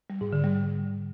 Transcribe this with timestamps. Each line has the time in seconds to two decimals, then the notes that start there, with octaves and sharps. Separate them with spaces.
0.10 G3
0.21 G#2
0.33 D3
0.44 G3